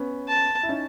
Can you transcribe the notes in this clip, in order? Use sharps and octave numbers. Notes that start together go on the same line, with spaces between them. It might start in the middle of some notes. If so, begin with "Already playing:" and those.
Already playing: B3 C#4
A5
E4
C#4 D#4